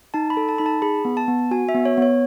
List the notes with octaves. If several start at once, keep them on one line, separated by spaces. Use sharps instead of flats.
D#4 A5
B5
A4
A5
D#4 B5
A5
G#4 B5
B3
A5
B3
F#4 G#5
E5
B3
C#5
B3 C#5